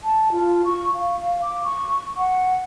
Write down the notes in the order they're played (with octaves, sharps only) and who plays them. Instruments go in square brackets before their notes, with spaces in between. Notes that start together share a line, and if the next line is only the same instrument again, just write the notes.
[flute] A5
F4
C#6
F5
D6
C#6
F#5